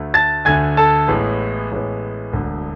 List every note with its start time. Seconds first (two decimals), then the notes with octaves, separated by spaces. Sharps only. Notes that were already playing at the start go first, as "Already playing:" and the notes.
Already playing: D2 D3 A3
0.14 A5 A6
0.45 D2 D3 A3 G#5 G#6
0.77 A4 A5
1.08 A1 A2 G#3 B3
1.71 A1 A2 G#3 B3
2.33 E1 D2 D3